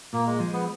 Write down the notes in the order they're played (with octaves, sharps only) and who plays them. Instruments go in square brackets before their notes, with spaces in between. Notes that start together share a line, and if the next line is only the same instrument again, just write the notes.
[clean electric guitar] A#2 [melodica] A#3
[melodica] G#3
[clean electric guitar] F3 G#3
[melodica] B3